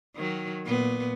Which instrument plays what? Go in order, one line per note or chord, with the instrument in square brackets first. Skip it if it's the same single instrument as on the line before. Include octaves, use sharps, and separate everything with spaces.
[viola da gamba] D#3 F#3
A#2 B3